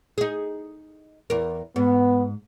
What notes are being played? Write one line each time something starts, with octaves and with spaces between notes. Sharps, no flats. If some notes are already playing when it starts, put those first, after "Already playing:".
D#4 G#4
E2 A#4
G#2 B3